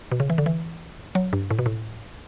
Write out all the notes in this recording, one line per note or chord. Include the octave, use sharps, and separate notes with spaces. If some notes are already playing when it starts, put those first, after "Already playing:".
B2
C#3
E3
D3
E3
F#3
G2
A2
B2
A2